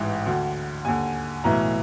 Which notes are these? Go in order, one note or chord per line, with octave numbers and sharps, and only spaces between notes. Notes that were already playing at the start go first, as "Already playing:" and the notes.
Already playing: A1 G#2 E3 G5
D2 D3
D#2 D3 G#5
B1 A2 E3 A#5